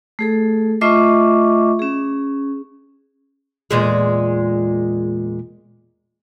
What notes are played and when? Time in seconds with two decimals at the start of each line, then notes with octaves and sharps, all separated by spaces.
0.19 A3 G#4 A4
0.81 A3 F4 D#5 E5 C#6 D6
1.79 C#4 G#4
3.71 E2 A#2 G#3